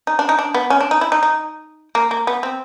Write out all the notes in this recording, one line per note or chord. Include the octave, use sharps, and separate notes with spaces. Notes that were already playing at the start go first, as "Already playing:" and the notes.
D#4
D4
D#4
D4
B3
C#4
D4
D#4
E4
D#4
D#4
A#3
A#3
B3
C4